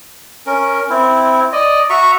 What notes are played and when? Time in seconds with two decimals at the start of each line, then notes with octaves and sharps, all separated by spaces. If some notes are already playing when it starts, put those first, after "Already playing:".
0.46 C#4 A#4
0.90 C4 E4
1.53 D5 D#5
1.90 F#4 E5 A#5 C#6